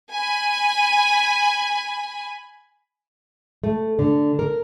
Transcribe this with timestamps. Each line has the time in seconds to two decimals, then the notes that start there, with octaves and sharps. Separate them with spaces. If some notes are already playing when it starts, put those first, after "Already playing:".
0.11 G#5 B5
3.64 A3
3.99 D3
4.39 A#4